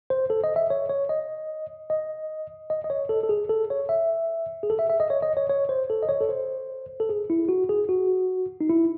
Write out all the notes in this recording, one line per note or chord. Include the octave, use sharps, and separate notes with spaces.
C5
A4
D#5
E5
C#5
C#5
D#5
D#5
D#5
D#5
C#5
A4
A4
G#4
A4
C#5
E5
G#4
A4
E5
E5
D#5
C#5
D#5
C#5
C#5
C5
A4
D#5
C#5
A4
C5
A4
G#4
E4
F#4
G#4
F#4
D#4
E4